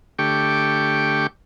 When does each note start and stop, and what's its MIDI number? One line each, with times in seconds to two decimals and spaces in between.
0.19 1.27 50
0.19 1.27 57
0.19 1.27 67
0.19 1.27 79
0.19 1.27 85
0.19 1.27 86